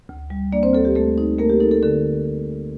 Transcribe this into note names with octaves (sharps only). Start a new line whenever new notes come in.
D2
G3
A#3 D4 D5
C4 C5
D2 A4
G4
A3 A4
D#4
A3 A#3 A#4
G4
D#4 A4
A4
D3 A4